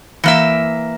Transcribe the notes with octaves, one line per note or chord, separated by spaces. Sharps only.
E3 A#3 E5